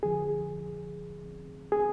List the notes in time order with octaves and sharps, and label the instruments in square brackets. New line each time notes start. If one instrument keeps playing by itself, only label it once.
[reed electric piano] F2 D3 F3 G#4
G#4